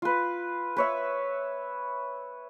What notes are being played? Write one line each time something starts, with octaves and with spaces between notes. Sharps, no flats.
F4 B4
B4 C#5 E5